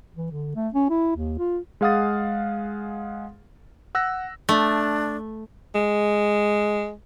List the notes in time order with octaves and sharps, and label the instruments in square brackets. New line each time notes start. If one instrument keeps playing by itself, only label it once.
[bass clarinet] E3
D3
A3
C#4
E4
D#2
F4
[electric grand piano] G#3 G#4 F5 F#5 D#6 A6
F#5 E6 F#6 A#6
[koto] A3 [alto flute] D4
[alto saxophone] G#3